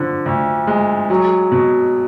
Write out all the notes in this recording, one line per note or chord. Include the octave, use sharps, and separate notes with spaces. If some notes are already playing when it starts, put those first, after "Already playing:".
Already playing: D3 F3
D2
G#3
F#3
B2